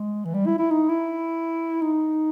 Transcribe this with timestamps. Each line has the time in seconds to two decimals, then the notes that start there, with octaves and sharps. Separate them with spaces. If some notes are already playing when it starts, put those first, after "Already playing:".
Already playing: G#3
0.25 E3
0.34 G3
0.46 E4
0.59 E4
0.70 D#4
0.89 E4
1.81 D#4